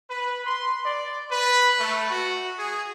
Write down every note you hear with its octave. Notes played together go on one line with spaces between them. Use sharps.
B4
C6
D5
B4
A3
F#4
G#4